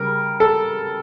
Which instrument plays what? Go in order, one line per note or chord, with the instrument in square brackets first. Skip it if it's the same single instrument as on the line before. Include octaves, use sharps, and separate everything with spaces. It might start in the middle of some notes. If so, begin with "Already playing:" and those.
Already playing: [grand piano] C#3 G3 A#4
A4